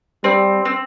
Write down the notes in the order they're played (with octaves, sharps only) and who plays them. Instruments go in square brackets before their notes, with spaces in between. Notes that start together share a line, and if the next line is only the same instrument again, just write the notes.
[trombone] G3 [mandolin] C4
[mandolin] C4